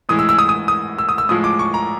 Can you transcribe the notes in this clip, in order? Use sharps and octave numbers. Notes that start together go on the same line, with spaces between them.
A2 E3 G#3 D#6
E6
E6
D#6
D#6
D#6
E6
D#6
E6
A2 F3 G#3 D#6
D6
C#6
A#5